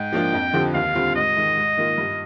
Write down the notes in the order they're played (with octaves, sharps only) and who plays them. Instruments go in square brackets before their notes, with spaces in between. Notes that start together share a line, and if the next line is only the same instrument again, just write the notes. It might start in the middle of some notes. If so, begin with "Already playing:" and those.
Already playing: [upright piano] G#2 [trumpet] G5
[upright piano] F3 A#3 D4 F4
F2
D3 F3 C4 G4
[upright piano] D#2 [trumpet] F5
[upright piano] D3 G3 C4 F4
[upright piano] G#2 [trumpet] D#5
[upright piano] D#3 G#3
G#2
D#3 A#3 F4
G2